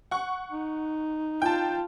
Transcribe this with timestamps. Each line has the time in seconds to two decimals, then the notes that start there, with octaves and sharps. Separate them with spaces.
0.11 F#5 C#6
0.52 D#4
1.42 F4 G5 A5